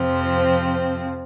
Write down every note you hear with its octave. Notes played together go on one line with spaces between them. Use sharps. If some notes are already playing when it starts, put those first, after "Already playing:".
Already playing: F2 C3 F3 C4